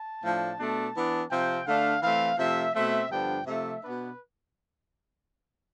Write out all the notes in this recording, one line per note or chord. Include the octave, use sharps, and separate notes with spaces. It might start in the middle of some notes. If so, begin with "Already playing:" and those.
Already playing: A5
A2 F3 A3 D4
B2 A3 D4
E3 B3 D4
C3 F3 C4 G5
D3 A3 D4 F5
E3 A3 C4 F5
C3 F3 A3 C4 E5
B2 A3 C4 E5
G2 D3 F3 B3 D4 G5
C3 F3 A3 E5
B2 B3 D4 B4